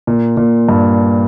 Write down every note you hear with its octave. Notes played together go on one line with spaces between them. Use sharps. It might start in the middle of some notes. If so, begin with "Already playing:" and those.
A#2
A#2
G2